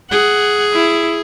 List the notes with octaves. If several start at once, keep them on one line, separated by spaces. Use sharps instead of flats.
G#4 F#5
E4